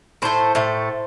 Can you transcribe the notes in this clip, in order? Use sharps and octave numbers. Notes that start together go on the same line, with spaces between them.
A2 A3 C5
A2 A3